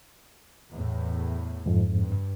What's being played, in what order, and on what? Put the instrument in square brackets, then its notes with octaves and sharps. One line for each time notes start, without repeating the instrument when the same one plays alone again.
[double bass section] E2 A2
[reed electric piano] F2 G#2
[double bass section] G2